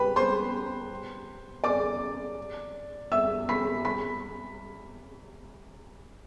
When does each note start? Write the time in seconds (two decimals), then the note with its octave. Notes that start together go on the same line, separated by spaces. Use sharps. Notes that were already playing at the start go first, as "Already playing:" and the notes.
Already playing: G4 B4 B5
0.16 C5 C6
1.64 D5 D6
3.12 E5 E6
3.49 B5 B6
3.85 B5 B6